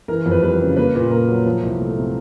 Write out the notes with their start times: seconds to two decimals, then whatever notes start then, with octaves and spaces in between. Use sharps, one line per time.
0.08 E3 A#4
0.26 F2
0.31 B4
0.43 G3 B4
0.60 C#3
0.77 A#3 B4
0.95 A#2
1.11 A#2 A#4
1.29 F#3
1.46 F3
1.63 C2
1.80 A3
1.98 C3